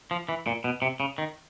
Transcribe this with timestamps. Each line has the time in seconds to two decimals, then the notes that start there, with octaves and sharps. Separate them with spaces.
0.11 F3
0.29 E3
0.47 A#2
0.64 B2
0.82 C3
1.00 C#3
1.18 D#3